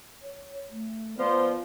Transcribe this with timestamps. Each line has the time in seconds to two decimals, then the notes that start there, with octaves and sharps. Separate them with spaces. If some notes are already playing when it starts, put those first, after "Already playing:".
0.22 C#5
0.70 A3
1.18 F3 B3 D5